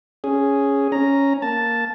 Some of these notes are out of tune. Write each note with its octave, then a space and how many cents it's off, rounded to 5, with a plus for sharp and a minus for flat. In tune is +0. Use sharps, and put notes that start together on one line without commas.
C#4 +0 G#4 +0
C#4 +0 A#5 +0
A#3 +0 A5 +0